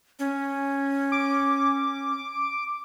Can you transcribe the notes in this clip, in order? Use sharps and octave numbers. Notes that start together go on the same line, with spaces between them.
C#4
D6